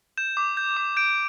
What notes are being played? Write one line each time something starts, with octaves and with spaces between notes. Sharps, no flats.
G6 E7
D6
G6
D6
G6 D7